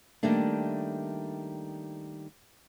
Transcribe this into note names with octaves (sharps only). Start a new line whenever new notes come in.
D#3 G3 A3 A#3 D4